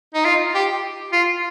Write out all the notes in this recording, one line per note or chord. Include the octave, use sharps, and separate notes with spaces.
D#4
F4
G4
F4